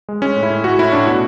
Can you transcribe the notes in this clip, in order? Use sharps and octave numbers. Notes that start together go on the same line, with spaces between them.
G#3
G#3 C#4
A2
E4
A2
A2 F#4
A2 E4
A2 D4
B2 F#4